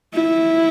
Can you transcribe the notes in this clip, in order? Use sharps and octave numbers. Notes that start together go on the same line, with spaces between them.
E4